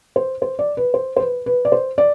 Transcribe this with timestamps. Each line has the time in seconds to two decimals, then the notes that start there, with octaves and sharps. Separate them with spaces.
0.16 C5
0.42 C5
0.59 D5
0.77 B4
0.94 C5
1.17 C5
1.20 B4
1.46 B4
1.65 D5
1.72 C5
1.98 D5